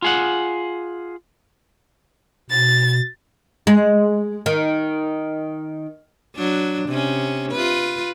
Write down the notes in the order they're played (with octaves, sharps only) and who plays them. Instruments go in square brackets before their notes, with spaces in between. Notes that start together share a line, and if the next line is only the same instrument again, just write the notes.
[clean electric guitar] F4 G#4 F#5
[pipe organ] B2 [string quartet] A6
[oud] G#3
D#3
[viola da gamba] F#3 D4
C3 C#4
F4 B4